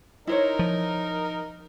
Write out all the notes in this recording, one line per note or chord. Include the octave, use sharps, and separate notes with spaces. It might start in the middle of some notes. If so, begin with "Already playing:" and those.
D#4 E4 A#4 C5 C#5
F3